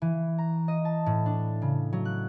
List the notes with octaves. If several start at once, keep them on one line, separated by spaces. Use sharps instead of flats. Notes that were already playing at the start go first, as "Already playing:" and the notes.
E3
A#5
D#5
A5
A2
D4
C#3
F#3
F#6